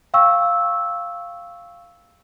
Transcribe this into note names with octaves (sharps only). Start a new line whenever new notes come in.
F5 G5 C#6 E6